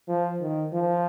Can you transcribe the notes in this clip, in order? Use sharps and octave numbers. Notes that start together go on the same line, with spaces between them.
F3
D#3
F3